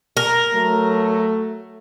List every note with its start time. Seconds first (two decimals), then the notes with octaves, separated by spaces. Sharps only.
0.17 A#4
0.54 F#3 A3